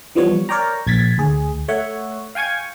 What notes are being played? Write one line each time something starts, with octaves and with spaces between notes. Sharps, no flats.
E3 F3 G3 B3 C#5
A#4 C#5 D5 G5 A#5
A#1 G#6 A6 B6
D2 G#4
A3 C#5 E5 F#5
F5 G5 G#5 C#6 G#6